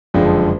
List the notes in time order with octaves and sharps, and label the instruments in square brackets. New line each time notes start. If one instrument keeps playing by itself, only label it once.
[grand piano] F#1 F2 D3 F3 G#3